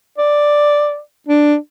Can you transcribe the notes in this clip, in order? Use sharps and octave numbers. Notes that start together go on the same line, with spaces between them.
D5
D4